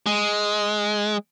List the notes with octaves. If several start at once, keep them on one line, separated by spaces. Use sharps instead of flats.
G#3